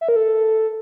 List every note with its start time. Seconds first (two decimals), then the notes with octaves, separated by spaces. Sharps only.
0.01 E5
0.09 A#4
0.16 A4